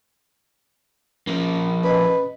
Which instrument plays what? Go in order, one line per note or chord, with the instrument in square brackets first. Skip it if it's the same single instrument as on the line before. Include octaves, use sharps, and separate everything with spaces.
[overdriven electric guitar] F3 A#3 [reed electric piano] C#4
[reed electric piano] C#4 D#5 [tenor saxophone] B4